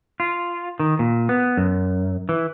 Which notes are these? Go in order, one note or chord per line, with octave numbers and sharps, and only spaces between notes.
F4
D#3
A#2
B3
F#2
E3